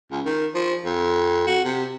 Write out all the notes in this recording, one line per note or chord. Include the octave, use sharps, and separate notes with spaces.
C#2
D#3
F3
F2
F#4
C3